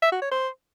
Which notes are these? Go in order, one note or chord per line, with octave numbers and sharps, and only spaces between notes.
E5
F#4
C#5
C5